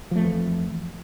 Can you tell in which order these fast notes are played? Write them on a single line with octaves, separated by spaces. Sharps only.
F3 A3 F2 E3